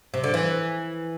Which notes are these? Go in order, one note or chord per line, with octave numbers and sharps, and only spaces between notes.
C3
D3
E3